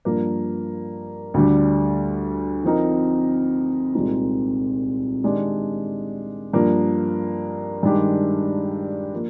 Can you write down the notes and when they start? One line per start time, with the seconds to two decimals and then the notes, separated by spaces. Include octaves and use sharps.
0.05 G2 F3 A#3
1.34 D2 D3 G3
2.64 F3 C4 D#4 A#4
3.94 C2 A#2 G#3 C4 D#4
5.23 D#3 G#3 D4 G4 D5
6.53 G2 F3 A#3
7.83 G2 D#3 G#3 D4 G4
9.13 F3 A#3